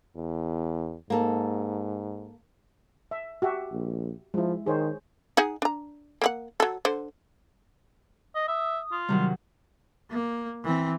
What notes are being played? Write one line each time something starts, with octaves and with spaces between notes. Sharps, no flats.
E2
G#2 A#3 A4
E5
F#4 G4 E5
A#1
F3 G#3 E4
D#3 G#4 C5 C#5
D#4 G#4 F#5
D4 A#5
A#3 C4 F#5
F#3 A4
D3 C5
D#5
E5 D#6
F4
C3 D#3 F#3 G3
A#3
E3 C4